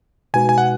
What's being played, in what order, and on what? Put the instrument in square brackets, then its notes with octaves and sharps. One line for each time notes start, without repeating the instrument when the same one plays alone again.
[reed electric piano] B2 G#3 D#4 F#4 B4 [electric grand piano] G#5
[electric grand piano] G#5
F#5